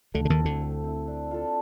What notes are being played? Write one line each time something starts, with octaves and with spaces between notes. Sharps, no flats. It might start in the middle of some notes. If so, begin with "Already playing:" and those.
D2 D3 A3
D3
D#2 D#3
C4 E4
D2 D3
A3
C4 E4
D4
F4 A4